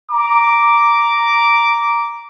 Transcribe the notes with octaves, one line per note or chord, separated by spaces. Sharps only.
A#5 D6